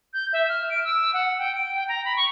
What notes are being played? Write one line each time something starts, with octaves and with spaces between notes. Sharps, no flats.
G6
E5
F6
D7
E6
F#5
G5
D7
G5
A#5
B5
C#6